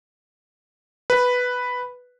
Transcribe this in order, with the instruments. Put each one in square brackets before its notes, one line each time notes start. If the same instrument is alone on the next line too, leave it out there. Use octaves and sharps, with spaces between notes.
[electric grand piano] B4